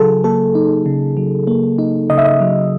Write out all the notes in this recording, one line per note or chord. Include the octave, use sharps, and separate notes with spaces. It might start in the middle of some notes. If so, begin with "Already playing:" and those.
Already playing: C#3 F#3 D#4 G#4 A4
A#3 A4
D#4
C#3
F#3
A#3
D#4
C#3 D#5
E5
D#5
F#3